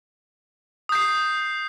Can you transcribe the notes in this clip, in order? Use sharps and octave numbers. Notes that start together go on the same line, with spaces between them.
D#6 G6 C7